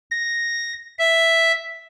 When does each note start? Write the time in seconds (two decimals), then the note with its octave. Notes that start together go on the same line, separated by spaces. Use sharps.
0.11 A#6
0.99 E5